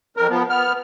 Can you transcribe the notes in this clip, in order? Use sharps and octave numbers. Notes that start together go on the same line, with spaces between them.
F2 A#4
F3 B3
B3 F6